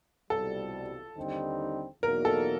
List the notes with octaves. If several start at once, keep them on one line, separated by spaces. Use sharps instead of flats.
C2 B2 G3 A4
D#2 D3 G3 C4 D#4
E2 B2 F#3 A#3 D#4 A#4
A4